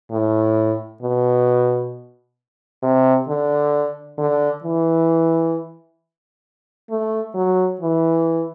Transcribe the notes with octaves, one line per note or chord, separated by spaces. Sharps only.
A2
B2
C3
D3
D3
E3
A3
F#3
E3